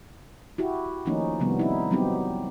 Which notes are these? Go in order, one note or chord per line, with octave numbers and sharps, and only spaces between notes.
E4 F#4 G4
D#3 F3 A3 A#3 C#4 D#4
C3 D#3 F3 G3 B3
D#4 E4
F#3 G3 B3 C4 D#4 G4